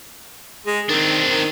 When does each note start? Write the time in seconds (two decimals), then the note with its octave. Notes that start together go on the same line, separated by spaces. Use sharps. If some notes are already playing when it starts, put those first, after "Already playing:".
0.66 G#3
0.89 D#3 C4 D4
1.26 D#3